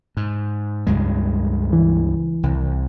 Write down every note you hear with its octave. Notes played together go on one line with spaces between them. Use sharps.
G#2
C#2 G2 G#3
E3
C2